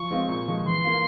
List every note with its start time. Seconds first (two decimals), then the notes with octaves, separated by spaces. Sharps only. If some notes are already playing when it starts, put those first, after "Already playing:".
Already playing: F3 C#6
0.11 G#3 C4 F4
0.28 A#2
0.48 F3 G#3
0.65 E3 C6
0.84 A#3 F4